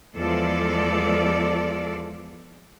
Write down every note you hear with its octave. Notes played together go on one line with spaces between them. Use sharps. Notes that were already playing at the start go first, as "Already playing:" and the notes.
E2 F3 G#3 A4 D5